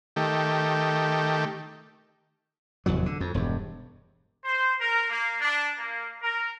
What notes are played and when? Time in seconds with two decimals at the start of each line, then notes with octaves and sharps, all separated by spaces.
0.16 D#3 A3 G4
2.86 F1 E2 A2 F#3
3.06 D3
3.20 F2
3.34 E1 G2
4.44 C5
4.81 A#4
5.10 A#3
5.41 D4
5.78 A#3
6.22 A#4